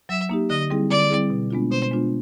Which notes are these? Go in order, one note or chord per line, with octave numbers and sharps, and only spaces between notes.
F#3 E5
A#3 D#4 G4
D3 D#5
G3 C4 E4 G#4
D3 D5
G3 C4 E4 G#4
B2
G#3 B3 D4 F4
B2 C5
G#3 B3 D4 F4